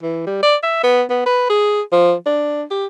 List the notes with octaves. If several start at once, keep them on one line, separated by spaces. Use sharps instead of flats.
E3
G3
D5
E5
B3
B3
B4
G#4
F3
D4
G4